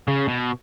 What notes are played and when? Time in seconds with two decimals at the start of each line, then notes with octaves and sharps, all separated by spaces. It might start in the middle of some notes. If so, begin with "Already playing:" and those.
0.08 C#3
0.28 B2